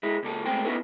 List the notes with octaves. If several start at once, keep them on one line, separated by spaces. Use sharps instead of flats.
G#3 E4
C#2 A#2 A4
G#3 A3 C4 A4 C5 G5
B3 C#4 D#4 E4 A4 B4